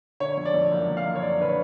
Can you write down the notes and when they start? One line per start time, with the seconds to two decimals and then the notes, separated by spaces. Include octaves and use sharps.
0.20 D3 C#5
0.37 F2
0.45 D5
0.54 F2
0.71 F#1
0.88 F#1
0.97 F5
1.06 F#1
1.15 C#5
1.22 F#1 D5
1.40 D3 B4
1.47 C#5